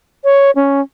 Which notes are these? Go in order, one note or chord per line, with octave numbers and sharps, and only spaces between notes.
C#5
C#4